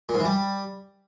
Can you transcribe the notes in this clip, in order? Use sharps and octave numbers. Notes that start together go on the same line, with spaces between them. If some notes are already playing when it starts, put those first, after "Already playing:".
A#2
G#2
E3
G3